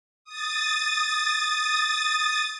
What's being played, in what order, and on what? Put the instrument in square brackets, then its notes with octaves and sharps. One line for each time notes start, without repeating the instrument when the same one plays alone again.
[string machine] D#6 A6